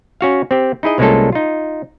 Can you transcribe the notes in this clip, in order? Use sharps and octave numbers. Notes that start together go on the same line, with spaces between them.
C#4 F#4 F5
C4 G4
D#4 E4 G#4 D#5
C2 G#3 A#3 C#4 F4 A4
D#4 F4